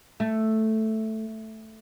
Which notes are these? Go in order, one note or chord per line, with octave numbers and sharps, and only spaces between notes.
A3